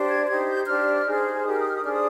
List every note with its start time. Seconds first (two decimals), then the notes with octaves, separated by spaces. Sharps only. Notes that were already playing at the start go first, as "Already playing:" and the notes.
Already playing: D4 G4 C5
0.09 G#6
0.28 D#4 G4 C5 G#6
0.47 G6
0.66 D4 G4 C5 F6
1.06 D#4 G#4 C5
1.43 D#4 G4 A#4 D#6
1.53 F6
1.60 D#6
1.67 F6
1.75 D#6
1.83 D4 G#4 C5 F6
1.92 D#6